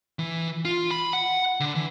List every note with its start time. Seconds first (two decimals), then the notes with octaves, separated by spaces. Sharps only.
0.19 E3
0.65 F4
0.91 B5
1.13 F#5
1.60 D3
1.75 E3